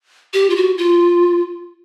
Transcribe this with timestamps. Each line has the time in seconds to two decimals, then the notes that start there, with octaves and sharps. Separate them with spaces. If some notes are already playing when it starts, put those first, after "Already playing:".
0.34 G4
0.50 F4
0.56 F#4
0.78 F4